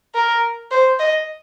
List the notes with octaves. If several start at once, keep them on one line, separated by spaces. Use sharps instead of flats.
A#4
C5
D#5